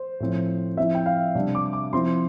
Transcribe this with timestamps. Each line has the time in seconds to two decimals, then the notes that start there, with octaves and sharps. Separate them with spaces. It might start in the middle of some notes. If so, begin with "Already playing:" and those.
Already playing: C5
0.20 A2 F3 C4
0.77 F3 C4 E4 E5
0.95 G5
1.06 F5
1.35 C3 G3 D4
1.55 D6
1.73 D6
1.93 F3 C4 E4 C6